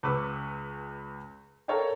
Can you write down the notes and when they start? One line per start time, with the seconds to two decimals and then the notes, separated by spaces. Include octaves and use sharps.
0.03 C#2 B4 C#6 D6 E6
1.68 A4 A#4 C#5 D#5 F5 G5